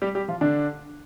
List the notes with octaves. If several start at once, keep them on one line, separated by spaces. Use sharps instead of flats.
G3 G4
G3 G4
F3 F4
D3 D4